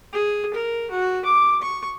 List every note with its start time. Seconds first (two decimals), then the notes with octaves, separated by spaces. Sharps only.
0.13 G#4
0.54 A#4
0.91 F#4
1.25 D6
1.62 C#6